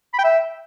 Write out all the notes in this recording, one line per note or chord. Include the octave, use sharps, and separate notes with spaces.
B5
G5
E5